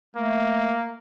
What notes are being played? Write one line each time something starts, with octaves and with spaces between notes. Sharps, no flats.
A3 A#3